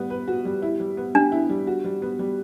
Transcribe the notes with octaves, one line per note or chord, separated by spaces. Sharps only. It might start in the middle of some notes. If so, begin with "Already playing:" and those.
Already playing: G3 B3
B4
F#4
G3
E4
G3
B3
D4 G4
E4
G3
F#4
G3
B3
G3